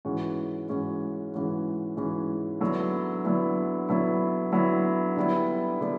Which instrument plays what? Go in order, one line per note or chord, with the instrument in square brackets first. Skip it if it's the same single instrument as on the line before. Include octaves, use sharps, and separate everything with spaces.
[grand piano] G#2 E3 G#3 C#4 F#4
G#2 E3 G#3 C#4 F#4
G#2 E3 G#3 C#4 F#4
G#2 E3 G#3 C#4 F#4
D3 F#3 B3 E4
D3 F#3 B3 E4
D3 F#3 B3 E4
D3 F#3 B3 E4
D3 G3 B3 E4
D3 G3 B3